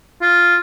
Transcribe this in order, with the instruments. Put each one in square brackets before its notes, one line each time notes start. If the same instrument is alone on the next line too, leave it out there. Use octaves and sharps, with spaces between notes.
[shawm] F4